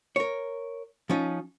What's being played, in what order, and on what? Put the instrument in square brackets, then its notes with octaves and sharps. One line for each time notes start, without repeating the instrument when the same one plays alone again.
[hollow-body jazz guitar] A#4 C#5
F3 C#4 D#4